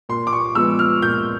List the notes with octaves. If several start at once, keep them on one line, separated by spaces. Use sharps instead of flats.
A#2 C6
D6
C#6
F3 G#3 B3 E6
F6
A#2 G6